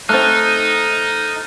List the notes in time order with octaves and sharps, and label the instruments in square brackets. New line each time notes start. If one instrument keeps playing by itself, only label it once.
[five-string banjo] A3 C4 [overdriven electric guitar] D#4 [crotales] F6 A6 [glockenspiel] F#6